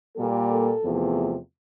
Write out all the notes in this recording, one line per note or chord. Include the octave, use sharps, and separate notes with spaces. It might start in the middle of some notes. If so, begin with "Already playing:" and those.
A#2 G3 A#3 A4
A4
E2 C3 F3 A3